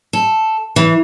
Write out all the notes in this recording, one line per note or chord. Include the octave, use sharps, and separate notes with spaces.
A4
E3